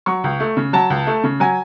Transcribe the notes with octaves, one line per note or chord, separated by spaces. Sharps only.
F#3 C#6
C#2
A3
C#3
F#3 A5
C#2
A3
C#3
F#3 G#5